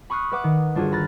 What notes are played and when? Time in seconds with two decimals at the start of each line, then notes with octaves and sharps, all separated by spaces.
0.10 B5 C#6 D#6 F6 F#6 C7
0.32 B4 E5 F#5 D6 D#6
0.44 D#3
0.75 G1 D4 F4 F#4 G#4
0.92 A#5 B5 F6 F#6 A6